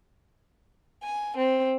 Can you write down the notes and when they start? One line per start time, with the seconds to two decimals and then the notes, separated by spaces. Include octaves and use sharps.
1.03 G#5
1.37 C4